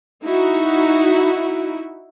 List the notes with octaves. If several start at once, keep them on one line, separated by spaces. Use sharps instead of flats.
D#4 E4 F#4